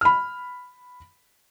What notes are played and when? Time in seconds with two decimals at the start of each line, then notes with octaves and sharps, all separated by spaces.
0.01 B5 F6